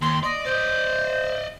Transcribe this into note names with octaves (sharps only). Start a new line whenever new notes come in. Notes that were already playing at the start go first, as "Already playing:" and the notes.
D#2 C6
D5 D#5
C5 D5 D#5